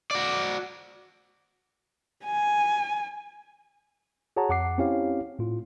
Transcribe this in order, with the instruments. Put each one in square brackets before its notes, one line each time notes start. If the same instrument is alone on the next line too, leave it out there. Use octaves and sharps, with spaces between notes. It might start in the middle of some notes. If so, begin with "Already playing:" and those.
[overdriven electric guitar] F#4 D5
[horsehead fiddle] G#5
[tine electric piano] F#4 G#4 C#5 F#5 A5 A#5
F2 F#5 D6 C7
C4 C#4 E4 G4 C#5 F5
A2 F4